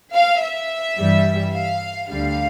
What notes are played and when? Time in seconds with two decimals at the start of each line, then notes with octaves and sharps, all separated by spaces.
0.13 F5
0.41 E5
0.98 G2 E3 G3
1.54 F5
2.10 D2 D3 G3 F5